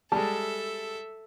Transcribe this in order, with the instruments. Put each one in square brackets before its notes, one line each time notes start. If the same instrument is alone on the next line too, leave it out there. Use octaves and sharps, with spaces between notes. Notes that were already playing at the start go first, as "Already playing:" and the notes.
[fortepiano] G3 G#3 [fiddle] A4 E5 [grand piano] A5